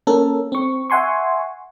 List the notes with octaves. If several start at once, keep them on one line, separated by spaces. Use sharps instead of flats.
A#3 C#4 A4 A#4
C4 C#6
E5 F#5 G#5 C6 C#6